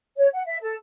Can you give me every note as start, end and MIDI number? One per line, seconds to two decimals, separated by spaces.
0.16 0.27 73
0.33 0.43 78
0.45 0.56 76
0.60 0.74 69